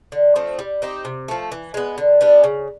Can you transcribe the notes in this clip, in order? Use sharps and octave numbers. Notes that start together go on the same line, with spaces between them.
D3
F3 A3 C4
G3
C4 D#4 G4
C3
F3 A3
E3
G#3 B3
D3
G3 B3 D4
C#3